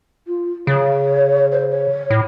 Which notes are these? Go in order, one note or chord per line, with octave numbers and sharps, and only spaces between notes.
F4
C#3 C#5
C5
C#5
A2